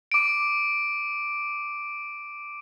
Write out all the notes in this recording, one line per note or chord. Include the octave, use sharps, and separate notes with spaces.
D6 D7